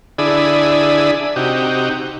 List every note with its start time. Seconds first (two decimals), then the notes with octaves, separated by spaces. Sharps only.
0.18 D3 D4 E4 G#4 B5 D#6
1.36 C3 D#4 F#4 G4